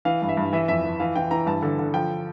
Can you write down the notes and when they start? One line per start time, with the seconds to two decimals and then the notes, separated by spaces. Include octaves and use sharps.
0.05 E3 F5
0.22 G2
0.29 E5
0.37 G2
0.53 E3 E5
0.68 F2 E5
0.84 E3
1.00 E3 F5
1.16 E3 G5
1.31 E3 A#5
1.47 G2 A5
1.62 D3
1.79 D3
1.94 F3 G5